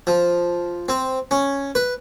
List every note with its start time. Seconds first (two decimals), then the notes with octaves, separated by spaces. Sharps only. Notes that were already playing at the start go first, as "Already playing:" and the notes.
0.07 F3
0.89 C4
1.31 C#4
1.75 B4